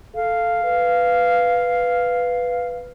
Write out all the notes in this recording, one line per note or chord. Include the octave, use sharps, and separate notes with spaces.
A4 F5
B4